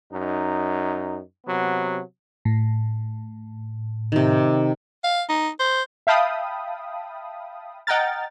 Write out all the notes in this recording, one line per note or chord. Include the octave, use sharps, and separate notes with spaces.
F#2 D#4
C3 F#3 B3
A2
C3 D#3
F5
D#4
C5
E5 F5 G5 A5 B5 D#6
D#5 F#5 G5 A#5 F6 A6